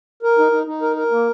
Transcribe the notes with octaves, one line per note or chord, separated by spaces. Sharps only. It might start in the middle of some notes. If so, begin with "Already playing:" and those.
A#4
D#4
D#4
D#4
A#4
A#4
A#3